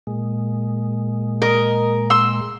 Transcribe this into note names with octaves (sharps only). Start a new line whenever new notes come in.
A#2 G#3
A#4 D#5
C6 E6